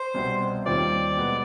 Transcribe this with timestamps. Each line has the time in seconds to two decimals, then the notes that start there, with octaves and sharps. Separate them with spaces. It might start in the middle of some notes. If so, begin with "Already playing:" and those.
Already playing: C5
0.14 C2 B2 G3 C4
0.65 D#2 D#3 G3 C4 F4 D5
1.16 B2 G#3 B3